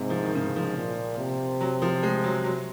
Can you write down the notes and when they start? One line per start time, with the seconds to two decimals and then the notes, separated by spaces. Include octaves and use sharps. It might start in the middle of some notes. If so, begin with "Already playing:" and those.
Already playing: G#2 C3
0.10 F3
0.23 D#3
0.35 G#2 C#3
0.56 F3
0.77 A#2
1.19 C3
1.61 F#3
1.82 F3
2.03 G#3
2.24 F#3
2.44 F#3